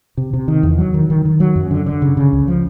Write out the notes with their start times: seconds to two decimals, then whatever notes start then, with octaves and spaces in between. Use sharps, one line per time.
0.17 C3
0.33 C3
0.48 D#3
0.63 E2
0.78 F#3
0.94 D#3
1.10 D#3
1.25 D#3
1.40 F#3
1.56 F#2
1.71 D3
1.86 D3
2.02 C#3
2.17 C#3
2.33 C#2
2.48 F3